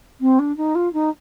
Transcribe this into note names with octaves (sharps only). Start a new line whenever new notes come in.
C4
D4
D#4
F4
D#4